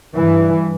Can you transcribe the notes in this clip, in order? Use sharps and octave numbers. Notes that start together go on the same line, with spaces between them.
G2 E3